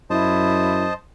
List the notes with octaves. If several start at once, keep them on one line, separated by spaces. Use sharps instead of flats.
F#2 E4 C5 D#5 A5